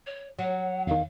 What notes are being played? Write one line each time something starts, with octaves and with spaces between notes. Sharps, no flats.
C#5
F#3 F#5
E2 D#3 F5